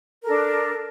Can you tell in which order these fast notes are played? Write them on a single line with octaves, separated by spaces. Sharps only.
A#4 A4 D4